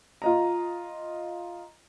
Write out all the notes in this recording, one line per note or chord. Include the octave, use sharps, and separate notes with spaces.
F4 D#5 A#5